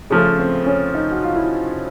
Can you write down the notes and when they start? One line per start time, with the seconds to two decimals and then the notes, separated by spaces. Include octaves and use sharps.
0.10 C#3 F3 A3 C#4
0.39 C4
0.66 C#4
0.95 D#4
1.11 F#4
1.24 F4
1.36 E4